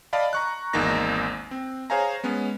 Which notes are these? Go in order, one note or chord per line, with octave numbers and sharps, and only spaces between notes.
D5 D#5 F5 A5 B5
A#5 C#6 F#6
G#1 E2 A#3 D#4 A#6
C4
G#4 C5 C#5 F5 G#5 A#5
G#3 B3 C#4